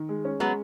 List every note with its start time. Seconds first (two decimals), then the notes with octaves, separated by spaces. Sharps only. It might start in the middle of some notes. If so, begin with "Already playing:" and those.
Already playing: D#3
0.09 G#3
0.25 C#4
0.40 F#3 G#3 B3